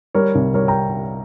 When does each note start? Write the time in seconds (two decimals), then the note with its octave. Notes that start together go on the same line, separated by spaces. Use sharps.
0.15 G3 A#4 C#5
0.35 C2
0.54 G3 A#4 C#5
0.68 G5 A#5